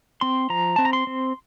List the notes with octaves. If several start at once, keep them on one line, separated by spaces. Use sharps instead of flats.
C4 C6
F3 A#5
C4 A5
A#5
C6
C4